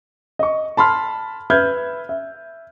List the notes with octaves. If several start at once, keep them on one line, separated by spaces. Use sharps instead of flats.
D#5 C#6
A5 B5 C6 F6
B4 E5 F6 G6 G#6
E5